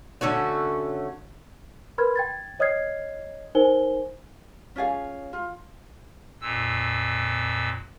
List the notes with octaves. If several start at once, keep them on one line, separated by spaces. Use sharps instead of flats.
D3 A3 C#4 F#4
A#4 B4 B5 C6 F6 G#6
G5 G#6 A6
C#5 D#5 D#6 F6 G#6 C7
D#4 A#4 C5 G#5 G7
C#4 F4 G#4 F5
F4
F2 A#2 E6